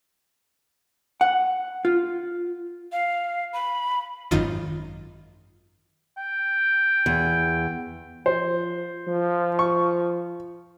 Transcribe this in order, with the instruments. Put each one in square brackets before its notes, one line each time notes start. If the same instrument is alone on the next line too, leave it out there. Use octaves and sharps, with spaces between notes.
[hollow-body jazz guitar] F#5
F4
[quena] F5
B5
[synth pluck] G#1 F#2 D#3 F4 D#7
[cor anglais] G5
[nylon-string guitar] E2
[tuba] F3 [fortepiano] C5
[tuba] F3
[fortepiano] C#6